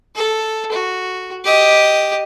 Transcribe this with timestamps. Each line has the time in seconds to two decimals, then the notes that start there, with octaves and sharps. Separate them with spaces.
0.15 A4
0.72 F#4
1.45 G4 D#5